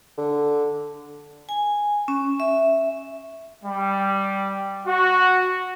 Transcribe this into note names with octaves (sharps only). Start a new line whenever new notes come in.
D3
G#5
C#4
E5
G3
F#4